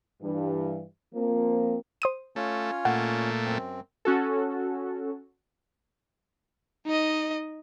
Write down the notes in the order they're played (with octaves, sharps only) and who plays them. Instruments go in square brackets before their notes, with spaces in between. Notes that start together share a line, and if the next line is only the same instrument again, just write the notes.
[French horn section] G2 E3
F3 A#3 C4
[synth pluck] C5 D#6 D#7
[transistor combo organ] A3 [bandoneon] C#4 F4 C#5
[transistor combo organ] A#2 A3 [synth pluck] F#5
[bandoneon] F#2 C4
[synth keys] C#4 F#4 A4
[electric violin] D#4 D#5